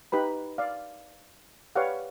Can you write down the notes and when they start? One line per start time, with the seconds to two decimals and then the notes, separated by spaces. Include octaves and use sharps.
0.12 D#4 G4 B4 B5
0.58 D5 F5
1.76 G4 B4 C#5 D5 F5 F#5